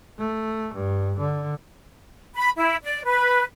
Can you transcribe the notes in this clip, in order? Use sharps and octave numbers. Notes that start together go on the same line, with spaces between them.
A3
G2
D3
B5
E4
D5
B4